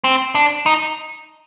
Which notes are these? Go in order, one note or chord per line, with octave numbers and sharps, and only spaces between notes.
C4
D4
D#4